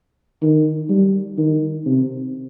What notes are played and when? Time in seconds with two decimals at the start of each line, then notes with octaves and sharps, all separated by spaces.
0.42 D#3
0.89 G3
1.38 D#3
1.86 C3